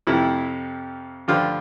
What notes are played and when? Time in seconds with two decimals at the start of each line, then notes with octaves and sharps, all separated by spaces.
0.07 F2 C3 F3 E4
1.28 G2 D3 F3 F4